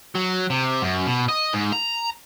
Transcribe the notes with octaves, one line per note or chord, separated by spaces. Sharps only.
F#3
C3
F#2
B2
D#5
G#2
A#5